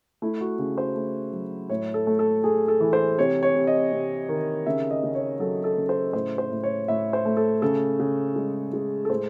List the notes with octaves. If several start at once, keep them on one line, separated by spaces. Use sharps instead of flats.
A3 E4
F#4
C#3
C5
A3
F#3
A2 C#5
A4
A3
A4
A3 G#4
A4
E3
C5
C3 C#5
C#5
C3
D#5
C3
D#3
C#3 E5
D#5
C#3
C#5
F#3 A4
A4
C#3
C5
A2 C5
C5
A2
C#5
A2 E5
C5
A3
A4
C#3 A4
C#3
G#3
G#3
A4
A2 C5